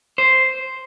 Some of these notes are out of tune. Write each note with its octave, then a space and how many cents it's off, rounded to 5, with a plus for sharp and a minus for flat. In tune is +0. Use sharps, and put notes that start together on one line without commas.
C5 +0